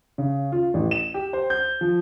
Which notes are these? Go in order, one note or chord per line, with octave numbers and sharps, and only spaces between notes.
C#3
F4
A1
E7
G4
C5
G6
F3